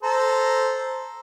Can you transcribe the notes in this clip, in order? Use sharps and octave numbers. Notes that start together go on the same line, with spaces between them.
A4 C5 A#5